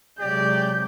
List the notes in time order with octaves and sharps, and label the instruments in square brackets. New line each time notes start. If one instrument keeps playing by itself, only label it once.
[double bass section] C3 F#3 G#3 [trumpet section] G4 D5 [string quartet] G6